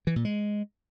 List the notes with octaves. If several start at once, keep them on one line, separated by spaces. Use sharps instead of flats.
E3
A#2
G#3